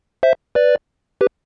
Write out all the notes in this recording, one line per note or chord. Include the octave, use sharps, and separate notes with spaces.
C5 E5
B4 D5
G4 B4